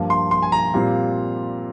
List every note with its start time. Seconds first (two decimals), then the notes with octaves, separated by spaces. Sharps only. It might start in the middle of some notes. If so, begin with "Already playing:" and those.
Already playing: G2 F3 A#3
0.10 C6
0.31 C6
0.42 G#5
0.52 A#5
0.74 A#2 G3 C4 F4